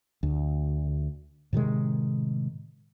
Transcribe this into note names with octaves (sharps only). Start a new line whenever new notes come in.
D2
A2 C3 D#3 G#3